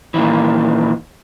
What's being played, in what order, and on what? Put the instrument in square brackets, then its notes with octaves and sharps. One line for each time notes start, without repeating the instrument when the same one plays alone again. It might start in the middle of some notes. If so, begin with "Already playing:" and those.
[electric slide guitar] A#2 D#3 E3